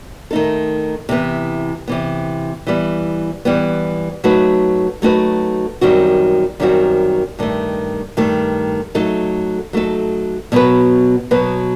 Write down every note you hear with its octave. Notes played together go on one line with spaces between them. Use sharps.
D#3 A3 D#4 A4
C3 E3 B3
C3 E3 B3
E3 G3 B3
E3 G3 B3
F#3 A3 D#4 F#4 B4
F#3 A3 D#4 F#4 B4
F#2 D#3 G3 C4 F#4
F#2 D#3 G3 C4 F#4
G2 D#3 A3
G2 D#3 A3
F#3 A3 D#4 A4
F#3 A3 D#4 A4
B2 F#3 B3 F#4 B4
B2 F#3 B3 F#4 B4